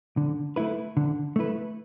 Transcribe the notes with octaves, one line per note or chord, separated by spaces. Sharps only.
D3
A3 E4 B4
D3
A3 E4 B4